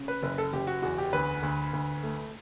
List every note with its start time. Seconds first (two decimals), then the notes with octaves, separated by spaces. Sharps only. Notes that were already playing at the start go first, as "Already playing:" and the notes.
Already playing: C#3
0.08 B4
0.23 F#1 B4
0.38 A4
0.53 F#1 G4
0.67 F#4
0.82 E2 F#4
0.98 G4
1.13 D2 B4
1.43 D2
1.73 D2
2.03 A3